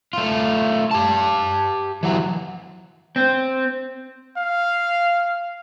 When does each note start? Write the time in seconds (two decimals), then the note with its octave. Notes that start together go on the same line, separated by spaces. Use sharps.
0.13 A3 F4
0.91 G4 A5
2.03 E3 F#3
3.16 C4
4.37 F5